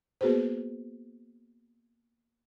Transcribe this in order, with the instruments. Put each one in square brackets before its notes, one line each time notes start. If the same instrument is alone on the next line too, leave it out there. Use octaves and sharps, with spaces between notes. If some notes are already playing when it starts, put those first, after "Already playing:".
[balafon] A#3 B3 F#4 G#4 B4 C5